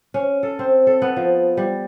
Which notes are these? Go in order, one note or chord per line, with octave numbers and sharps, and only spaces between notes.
C#4
A4
C4
A4
B3
F3
G3